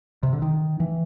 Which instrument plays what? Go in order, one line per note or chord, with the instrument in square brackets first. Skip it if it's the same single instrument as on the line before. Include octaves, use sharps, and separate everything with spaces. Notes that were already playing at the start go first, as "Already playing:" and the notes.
[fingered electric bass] C3
D3
D#3
E3